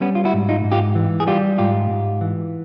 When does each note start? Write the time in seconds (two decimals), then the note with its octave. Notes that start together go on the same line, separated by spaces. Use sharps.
0.01 G3 B3 C#4
0.15 F4
0.25 E4 F#4
0.33 G#2
0.49 D#4 F4
0.64 G#2
0.72 F4 G4
0.95 E3
1.20 G#4
1.27 G3 F4 G4
1.58 G#2 F4 G4
1.90 G#2
2.21 E3